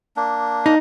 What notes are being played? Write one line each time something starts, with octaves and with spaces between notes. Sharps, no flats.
A#3 D4
D#4